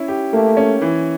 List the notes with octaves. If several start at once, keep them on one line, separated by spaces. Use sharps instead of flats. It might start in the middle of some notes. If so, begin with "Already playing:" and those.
Already playing: C#4 E4
G4
A3 A#3
C#4
E3